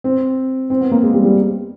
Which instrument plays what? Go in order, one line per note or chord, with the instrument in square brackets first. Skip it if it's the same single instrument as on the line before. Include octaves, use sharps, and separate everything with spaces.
[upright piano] C4
C4
B3
A#3
G#3
G3
G3